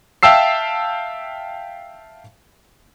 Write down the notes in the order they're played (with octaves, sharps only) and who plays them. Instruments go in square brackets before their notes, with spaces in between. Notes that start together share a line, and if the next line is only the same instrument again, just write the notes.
[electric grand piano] E5 F5 G5 A5 E6 C7